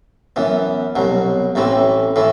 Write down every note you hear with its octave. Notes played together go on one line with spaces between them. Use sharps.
F#2 E3 B3
C2 B2 F#3
A1 A2 E3 A3 C4
A2 E3 A3